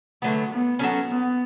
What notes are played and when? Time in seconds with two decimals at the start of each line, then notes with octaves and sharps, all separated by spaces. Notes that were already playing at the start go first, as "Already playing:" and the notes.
0.22 D3 F#3 A3 B3
0.51 B3
0.79 F#3 A3 C#4
1.07 B3